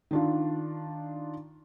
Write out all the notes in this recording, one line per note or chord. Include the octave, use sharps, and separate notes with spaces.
D#3 D4 F4